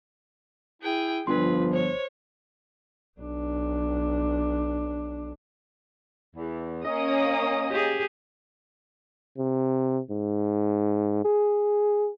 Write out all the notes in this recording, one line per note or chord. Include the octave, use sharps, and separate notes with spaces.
E4 G#4 G5
G1 F3 D4 F4 B4 C6
C5 C#5
B1 D4
E2
A#3 C#4 D#5 D#6
G4 G#4
C3
G#2
G#4